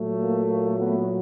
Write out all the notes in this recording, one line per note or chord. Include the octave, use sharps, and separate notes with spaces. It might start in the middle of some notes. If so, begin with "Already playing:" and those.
Already playing: A#2 F#3 A3
A#3
A#3
A3 B3